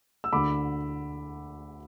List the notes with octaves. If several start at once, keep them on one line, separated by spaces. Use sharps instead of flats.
E6
D2 D3 B5 D6